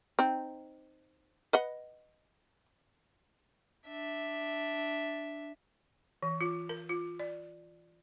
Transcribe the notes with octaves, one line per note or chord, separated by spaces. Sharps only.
C4 D#4
B4 D#5 F#5
D4 E5
E3
F4
A#4
F4
D5